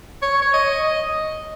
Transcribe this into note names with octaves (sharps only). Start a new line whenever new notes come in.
C#5
C#5
D#5
D#5